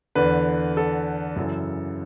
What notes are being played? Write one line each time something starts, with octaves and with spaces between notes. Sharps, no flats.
E2 D3 B4
A4
F#2 C#3 E3